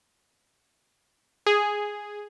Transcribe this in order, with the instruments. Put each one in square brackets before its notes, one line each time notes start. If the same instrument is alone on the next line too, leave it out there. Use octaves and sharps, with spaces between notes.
[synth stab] G#4